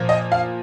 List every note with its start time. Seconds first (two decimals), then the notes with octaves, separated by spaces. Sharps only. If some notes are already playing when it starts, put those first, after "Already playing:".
Already playing: A#2 F3 A#3
0.09 D#5
0.32 F5